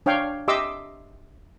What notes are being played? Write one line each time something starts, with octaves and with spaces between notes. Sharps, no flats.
D4 C#5 F5 G5
G4 D#5 E5 C6 D6 E6